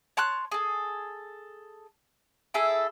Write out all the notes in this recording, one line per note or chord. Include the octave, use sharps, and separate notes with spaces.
C#5 A5 C6 F#6
G#4 A4
E4 G#4 A4 E5